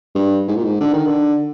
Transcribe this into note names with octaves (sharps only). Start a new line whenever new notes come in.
G2
G#2
A#2
G#2
D3
D#3
D3